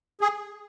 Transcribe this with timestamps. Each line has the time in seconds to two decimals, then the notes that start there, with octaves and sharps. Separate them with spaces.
0.21 G#4